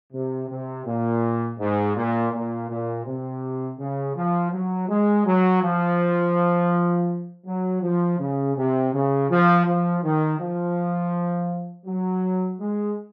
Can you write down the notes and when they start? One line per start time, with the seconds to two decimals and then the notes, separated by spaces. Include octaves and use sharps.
0.13 C3
0.49 C3
0.86 A#2
1.59 G#2
1.96 A#2
2.32 A#2
2.70 A#2
3.06 C3
3.79 C#3
4.16 F3
4.53 F#3
4.89 G#3
5.26 F#3
5.63 F3
7.46 F#3
7.83 F3
8.20 C#3
8.56 C3
8.94 C#3
9.30 F3
9.66 F3
10.04 D#3
10.39 F3
11.86 F#3
12.60 G#3